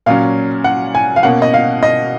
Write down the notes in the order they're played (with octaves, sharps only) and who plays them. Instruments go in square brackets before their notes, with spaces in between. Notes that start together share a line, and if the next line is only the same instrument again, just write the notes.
[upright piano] A#2 F#3 C#4 F5
F#5
G#5
F5
B2 A#3 C#4 F#5
D#5
F5
D#5